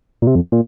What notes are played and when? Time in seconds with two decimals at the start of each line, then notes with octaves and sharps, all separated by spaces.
0.22 A#2
0.27 C3
0.35 F2
0.52 A#2